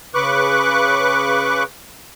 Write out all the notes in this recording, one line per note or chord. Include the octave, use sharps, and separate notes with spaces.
C#3 B4 C#6 D6 F#6